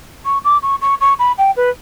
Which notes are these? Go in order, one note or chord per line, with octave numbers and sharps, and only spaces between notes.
C#6
D6
C#6
C#6
C#6
B5
G5
B4